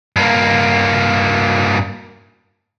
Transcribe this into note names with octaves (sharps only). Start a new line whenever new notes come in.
G2 A#3